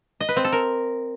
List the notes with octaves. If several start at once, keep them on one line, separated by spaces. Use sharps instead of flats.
D#5
B4
C4
A4
A#4